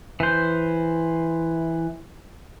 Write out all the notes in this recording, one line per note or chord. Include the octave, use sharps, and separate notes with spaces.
E3 C5